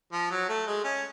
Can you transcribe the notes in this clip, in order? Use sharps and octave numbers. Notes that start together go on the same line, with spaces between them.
F3
F#3
A3
G#3
C#4